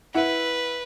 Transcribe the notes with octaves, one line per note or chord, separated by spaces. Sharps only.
E4 B4 E5 F#5